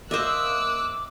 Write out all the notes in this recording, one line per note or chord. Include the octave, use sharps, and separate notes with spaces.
A#3 C5 D#5 E5 D6 E6 F#6